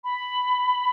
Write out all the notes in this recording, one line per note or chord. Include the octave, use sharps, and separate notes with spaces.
B5